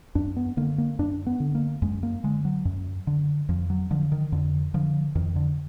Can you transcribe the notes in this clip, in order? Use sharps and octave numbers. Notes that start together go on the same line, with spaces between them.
F#2 D4
B3
D3 A#3
A#3
F#2 D4
B3
D3
A#3
F#2 G#3
A#3
D3 G#3
F#3
F#2
D3
F2 F3
F#3
D3 F3
D#3
F2 D3
D3 F3
F2 D#3
D3